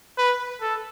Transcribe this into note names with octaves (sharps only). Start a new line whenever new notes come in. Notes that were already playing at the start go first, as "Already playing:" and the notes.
B4
A4